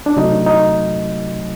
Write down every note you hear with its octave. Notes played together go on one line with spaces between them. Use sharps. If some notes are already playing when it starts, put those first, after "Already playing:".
D4
C3 F#3 A3 D#4
D#4